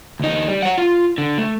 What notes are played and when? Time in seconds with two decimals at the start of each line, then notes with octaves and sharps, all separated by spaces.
0.20 D2 D#4
0.48 G3
0.63 C#5 F#5
0.78 F4
1.18 D3
1.38 A3